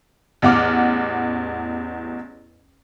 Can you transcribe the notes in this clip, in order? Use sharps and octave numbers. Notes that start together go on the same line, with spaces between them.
A1 E2 F#5 D6 F6